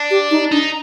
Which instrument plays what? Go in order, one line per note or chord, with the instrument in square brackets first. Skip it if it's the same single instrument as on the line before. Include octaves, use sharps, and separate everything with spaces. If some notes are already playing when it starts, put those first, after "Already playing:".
Already playing: [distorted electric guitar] D4
[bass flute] G4
D#4
[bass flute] D4 [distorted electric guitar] D#4